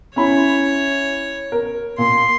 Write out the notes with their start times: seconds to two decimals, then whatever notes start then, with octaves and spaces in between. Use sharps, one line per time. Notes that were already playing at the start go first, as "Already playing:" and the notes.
0.16 C#4 E4 C#5 B5
1.52 A#4
1.98 A#2 C6